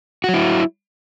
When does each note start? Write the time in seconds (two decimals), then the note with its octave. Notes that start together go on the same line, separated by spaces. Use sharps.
0.24 F#4
0.29 F#3
0.34 E4